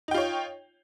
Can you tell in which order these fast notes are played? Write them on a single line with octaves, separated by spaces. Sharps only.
D#4 G5 F4 C#5